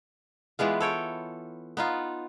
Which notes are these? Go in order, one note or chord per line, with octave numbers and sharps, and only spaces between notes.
E3 G#3 B3 F4
A4 C#5 G5
B3 D#4 F4